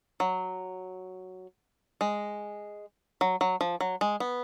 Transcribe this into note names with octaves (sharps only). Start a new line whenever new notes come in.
F#3
G#3
F#3
F#3
F3
F#3
G#3
B3